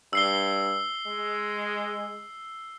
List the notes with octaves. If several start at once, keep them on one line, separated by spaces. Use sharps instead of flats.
G2 E6 C7 G7
G#3